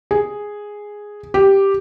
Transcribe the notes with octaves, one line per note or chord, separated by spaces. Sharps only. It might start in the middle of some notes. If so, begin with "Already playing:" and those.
G#4
G4